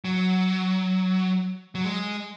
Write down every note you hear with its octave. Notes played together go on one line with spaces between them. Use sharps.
F#3
F#3
G#3